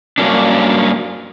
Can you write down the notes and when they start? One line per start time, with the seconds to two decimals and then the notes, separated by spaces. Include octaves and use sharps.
0.18 G2 F#3 A#3 C#4 D4